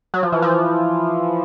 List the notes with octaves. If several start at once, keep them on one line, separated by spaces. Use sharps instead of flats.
F#3
F3
E3
F3